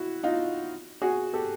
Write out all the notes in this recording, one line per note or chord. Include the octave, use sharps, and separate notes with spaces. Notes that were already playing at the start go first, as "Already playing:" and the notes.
Already playing: E4 F#4
D#4 F4
F#4 G#4
G4 A4